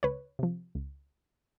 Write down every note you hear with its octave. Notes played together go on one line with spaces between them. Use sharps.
C#2 B4 C#5
C3 F3
C#2